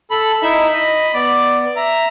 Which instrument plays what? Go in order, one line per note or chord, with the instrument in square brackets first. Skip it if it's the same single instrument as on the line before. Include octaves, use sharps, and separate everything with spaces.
[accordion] A4 B5
[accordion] D#4 E4 E5 [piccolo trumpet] B5
[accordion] D#5
[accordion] B3 [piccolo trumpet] D5
[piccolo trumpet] E5 [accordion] A#5